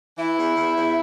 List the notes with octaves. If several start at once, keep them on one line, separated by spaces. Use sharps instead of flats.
E3 E4
E2
E2
E2